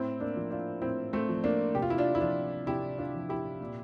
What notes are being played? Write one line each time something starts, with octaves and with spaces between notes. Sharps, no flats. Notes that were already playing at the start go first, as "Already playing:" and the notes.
Already playing: A2 C4 E4
A#3 D4
F3
D4 F4
A2 C4 E4
A3 C4
F3
A#3 D4
C3 G4
F4
E4
D4 F4
E4
F3 D4 F4
C3 E4 G4
D4 F4
F3
E4 G4
A#2